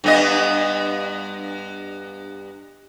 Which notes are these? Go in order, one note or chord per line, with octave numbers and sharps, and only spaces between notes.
G2 B3 D#5